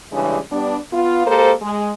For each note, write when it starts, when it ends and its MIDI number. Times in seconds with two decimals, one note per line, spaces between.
0.12 0.38 49
0.12 0.38 52
0.12 0.38 55
0.12 0.38 56
0.12 0.38 61
0.12 0.38 62
0.51 0.76 55
0.51 0.76 59
0.51 0.76 62
0.92 1.26 59
0.92 1.26 65
1.26 1.52 56
1.26 1.52 58
1.26 1.52 67
1.26 1.52 69
1.26 1.52 72
1.62 1.91 56